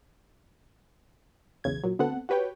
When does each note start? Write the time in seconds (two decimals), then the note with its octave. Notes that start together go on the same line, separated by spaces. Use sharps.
1.64 B1 E2 C#3 G#6
1.84 A#2 F#3
1.99 D2 B3 C4 A4 F#5
2.29 F#4 G4 B4 C#5 G5